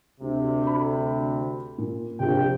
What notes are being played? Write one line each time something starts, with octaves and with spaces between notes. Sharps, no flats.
D2 C3
A4 B5
A#2
A#1 C3 F4 G5